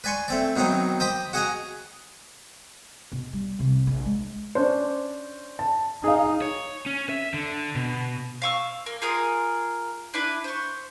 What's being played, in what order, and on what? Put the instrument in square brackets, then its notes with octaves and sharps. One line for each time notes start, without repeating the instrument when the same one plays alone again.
[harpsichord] B4 D5 G#5 C6 C#6
A3 C4 D5
B2 D#3 F#3 C4 D#4
C5 D#5 G5 B5 D6
F#4 G#4 D#5 F#5 G#5 A#5
[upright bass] B2
G3
C2 C3
A#1
G#3
[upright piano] C#4 D4 C5
A5
[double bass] D#4 [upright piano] G#4 F5
[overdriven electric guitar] C#5
C#4
E5
D3
B2
[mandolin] F5 C#6 E6
A#3
F4 G#4 A#4 D#6
D4 E4 B4
C5 C#6